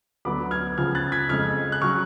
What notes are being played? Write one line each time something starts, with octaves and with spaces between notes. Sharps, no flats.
D2 D3 F#3 B3 B5 D6
F6 G#6
C#2 C#3 F3 F6 G#6
F#6 A6
G#6 B6
F2 C#3 G#3 F6 G#6
F#6
C#3 F#3 C#6 F6